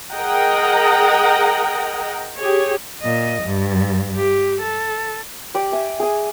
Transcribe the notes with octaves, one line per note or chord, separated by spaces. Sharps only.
G#4 A#4 D#5 F#5 G5 A#5
G4 G#4 C#5
A#2 D#5
G2
G4
A4
G4 D5
E5 G#5
G#4 G#5